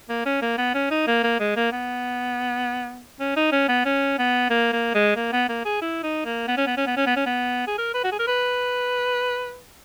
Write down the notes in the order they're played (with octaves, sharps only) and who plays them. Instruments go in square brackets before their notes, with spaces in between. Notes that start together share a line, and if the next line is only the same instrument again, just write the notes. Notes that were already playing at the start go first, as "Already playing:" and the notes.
[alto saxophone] A#3
C#4
A#3
B3
C#4
D#4
A#3
A#3
G#3
A#3
B3
C#4
D#4
C#4
B3
C#4
B3
A#3
A#3
G#3
A#3
B3
A#3
G#4
E4
D#4
A#3
B3
C#4
B3
C#4
B3
C#4
B3
C#4
B3
G#4
A#4
B4
F#4
G#4
A#4
B4